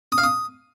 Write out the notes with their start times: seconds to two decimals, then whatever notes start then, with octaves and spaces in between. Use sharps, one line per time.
0.12 D#6
0.18 F5
0.24 D#6